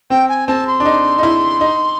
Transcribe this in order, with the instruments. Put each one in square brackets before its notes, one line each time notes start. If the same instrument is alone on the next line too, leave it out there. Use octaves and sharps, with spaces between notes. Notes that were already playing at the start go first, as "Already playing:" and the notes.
[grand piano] C4 [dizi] G5
[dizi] G#5
[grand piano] C4 [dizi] A5
[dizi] C6
[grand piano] D4
D#4
D#4
E4
D#4